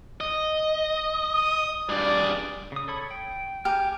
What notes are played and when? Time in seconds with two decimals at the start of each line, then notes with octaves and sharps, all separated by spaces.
0.21 D#5
1.34 D#6
1.89 G2 G#4 D5
2.72 C#3 D#6
2.88 A4 C#5 B5
3.11 G5
3.65 G4 G#5 A#5 F6